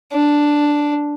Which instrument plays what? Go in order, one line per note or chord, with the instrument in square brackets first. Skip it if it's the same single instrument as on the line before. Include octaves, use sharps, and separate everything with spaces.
[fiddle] D4